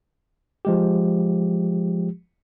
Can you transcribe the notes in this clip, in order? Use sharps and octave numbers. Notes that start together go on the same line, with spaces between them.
F3 G#3 G4